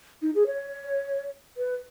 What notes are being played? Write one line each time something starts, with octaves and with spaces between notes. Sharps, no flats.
D#4
G#4
C#5
B4